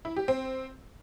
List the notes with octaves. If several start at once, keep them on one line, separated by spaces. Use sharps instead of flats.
E4
G4
C4